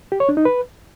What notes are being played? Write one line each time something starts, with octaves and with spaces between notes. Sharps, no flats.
G4
C#5
D4
D#4
B4